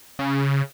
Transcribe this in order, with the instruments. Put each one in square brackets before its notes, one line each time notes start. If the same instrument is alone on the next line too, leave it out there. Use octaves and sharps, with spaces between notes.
[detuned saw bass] C#3